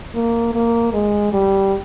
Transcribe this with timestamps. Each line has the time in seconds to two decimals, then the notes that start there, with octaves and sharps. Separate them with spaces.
0.15 A#3
0.55 A#3
0.93 G#3
1.33 G3